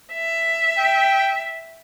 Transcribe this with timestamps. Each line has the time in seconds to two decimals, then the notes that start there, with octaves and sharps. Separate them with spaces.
0.12 E5
0.79 G5